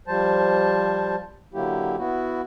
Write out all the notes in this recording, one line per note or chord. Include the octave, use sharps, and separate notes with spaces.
F3 G3 C5 A5
D3 F#3 A#3 E4 G4
B3 E4 F#4